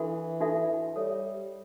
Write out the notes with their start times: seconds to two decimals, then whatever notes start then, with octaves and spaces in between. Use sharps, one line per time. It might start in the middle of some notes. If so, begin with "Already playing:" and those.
Already playing: E3 D4 F#4 A4 E5 B5
0.41 D4 F#4 A4 E5 B5
0.95 G3 A4 C#5 E5